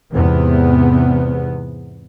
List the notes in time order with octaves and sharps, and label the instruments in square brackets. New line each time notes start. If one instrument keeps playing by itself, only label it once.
[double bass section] E2 G#2 C3 B3